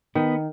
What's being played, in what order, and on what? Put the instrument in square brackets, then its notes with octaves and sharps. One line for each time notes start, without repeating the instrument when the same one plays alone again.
[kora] D#3 [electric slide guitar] B3